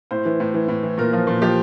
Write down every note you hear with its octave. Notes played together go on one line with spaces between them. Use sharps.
A2 C5
E3
A2
E3
A2
E3
A#2 A#4
F3
A#2
F3 G4